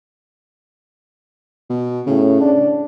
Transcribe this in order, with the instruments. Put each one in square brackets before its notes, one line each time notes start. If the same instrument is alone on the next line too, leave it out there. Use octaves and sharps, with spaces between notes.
[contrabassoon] B2
[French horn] A2 [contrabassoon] C#3
[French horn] D4